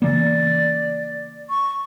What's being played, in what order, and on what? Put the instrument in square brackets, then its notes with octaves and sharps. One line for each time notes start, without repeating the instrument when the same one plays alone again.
[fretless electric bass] C#3 E3 A#3 [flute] D5
[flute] C#6